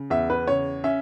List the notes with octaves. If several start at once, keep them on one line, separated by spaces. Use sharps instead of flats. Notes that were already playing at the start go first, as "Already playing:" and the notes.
Already playing: C#3
E2 E5
B4
C#3 C#5
C#4 E5